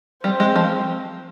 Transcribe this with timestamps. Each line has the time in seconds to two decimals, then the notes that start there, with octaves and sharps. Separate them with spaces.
0.24 G3 C4
0.40 G#3
0.56 F3